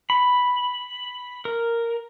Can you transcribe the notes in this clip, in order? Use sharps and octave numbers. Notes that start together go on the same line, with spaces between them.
B5
A#4